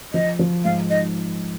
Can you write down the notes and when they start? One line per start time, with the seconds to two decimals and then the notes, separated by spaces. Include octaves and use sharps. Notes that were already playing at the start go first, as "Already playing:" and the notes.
0.13 F3 D#5
0.39 F3
0.64 G#2 F5
0.90 D#4 D#5